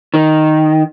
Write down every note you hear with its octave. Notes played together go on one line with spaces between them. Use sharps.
D#3